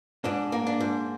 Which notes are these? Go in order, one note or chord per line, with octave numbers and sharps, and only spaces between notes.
G#2 D4
A#3
D4
G#2